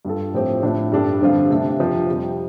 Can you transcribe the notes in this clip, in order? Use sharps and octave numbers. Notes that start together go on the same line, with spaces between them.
G2 G3 F4 A4
A2 F3 C4 G4
A2 F3 D4
G2 G3 D4 A4
G2 D3 F3 C4 F4
C3 A3 D4
F2 C3 F3
F2 C3 G3